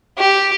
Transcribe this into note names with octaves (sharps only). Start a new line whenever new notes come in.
G4